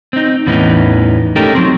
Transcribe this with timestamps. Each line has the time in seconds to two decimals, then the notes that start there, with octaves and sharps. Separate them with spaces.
0.13 C4 D#4
0.47 E2 A2 E3 B3 C#4 D#4
1.36 A3 C#4 D#4 G4 A4 A#4
1.55 F#3 C4